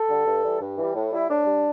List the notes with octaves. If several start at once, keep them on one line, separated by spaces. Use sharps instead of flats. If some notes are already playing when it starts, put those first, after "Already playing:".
Already playing: A4
D3 G3
G2
E3 G3
G2
E3 G3
A2
G3 E4
A2 D4
G3